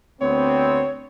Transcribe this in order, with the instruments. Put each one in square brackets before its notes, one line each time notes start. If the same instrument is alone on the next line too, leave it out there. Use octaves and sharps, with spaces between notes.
[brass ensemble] D2 B3 C4 [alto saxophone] C#5